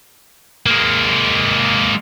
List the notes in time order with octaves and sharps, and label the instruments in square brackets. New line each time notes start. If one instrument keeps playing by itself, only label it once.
[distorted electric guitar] G#3 A#3